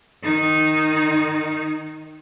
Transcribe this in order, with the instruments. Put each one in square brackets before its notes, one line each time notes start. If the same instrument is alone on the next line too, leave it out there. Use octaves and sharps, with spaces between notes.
[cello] D#3 D#4